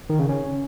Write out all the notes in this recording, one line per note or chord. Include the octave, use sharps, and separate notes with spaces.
D#3
C#3
C#4